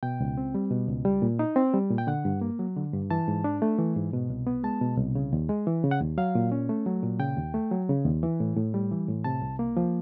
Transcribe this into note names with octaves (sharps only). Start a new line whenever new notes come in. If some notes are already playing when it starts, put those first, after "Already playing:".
B2 G5
C#2
C4
G3
B2
C#2
G3
A#2
D#4
C4
G3
A#2
G5
D3 F#5
G2
A#3
F#3
D3
G2
E3 A5
G#2
D4
A3
E3
G#2
B2
C2
B3
G#3 A5
B2
C2
C#3
D#2
G#3
E3
C#3
F#5
D#2
F#3 F5
A#2
C#4
A3
F#3
A#2
C#3 G5
D#2
A3
F#3
C#3
D#2
E3
A2
A2
G3
E3
A2
C3 A5
C2
A#3
F3